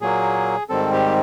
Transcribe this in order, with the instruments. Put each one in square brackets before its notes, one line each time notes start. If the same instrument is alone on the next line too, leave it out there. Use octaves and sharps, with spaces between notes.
[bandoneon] A#2 F#3 A#3 G#4
G#2 D#3 G3 C4 A4
G4